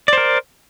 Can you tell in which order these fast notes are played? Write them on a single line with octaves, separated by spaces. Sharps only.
D5 C5 A#4